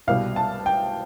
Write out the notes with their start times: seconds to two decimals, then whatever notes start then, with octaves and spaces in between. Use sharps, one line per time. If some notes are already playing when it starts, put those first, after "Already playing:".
0.07 C2 B2 G3 F5
0.36 A5
0.66 G5